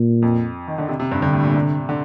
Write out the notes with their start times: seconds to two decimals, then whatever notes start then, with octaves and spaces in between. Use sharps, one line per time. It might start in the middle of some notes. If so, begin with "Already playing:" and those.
Already playing: A#2
0.22 F2
0.68 D#3
0.78 D3
0.89 C3
1.00 C3
1.11 G2
1.22 G2 D3
1.33 A2
1.44 A#2
1.56 C3
1.89 D3